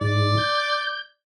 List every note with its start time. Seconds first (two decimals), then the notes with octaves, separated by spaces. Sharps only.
0.01 G#2 D5
0.37 G6